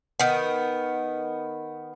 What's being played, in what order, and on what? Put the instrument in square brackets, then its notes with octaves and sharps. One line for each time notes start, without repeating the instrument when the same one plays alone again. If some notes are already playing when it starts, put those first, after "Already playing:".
[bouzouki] D#3 B3